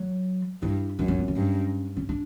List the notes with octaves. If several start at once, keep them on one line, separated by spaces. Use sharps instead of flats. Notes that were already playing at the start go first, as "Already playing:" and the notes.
Already playing: F#3
G2 E4
F#2 D4
C#4
B3
C#4
G2
C#4
D4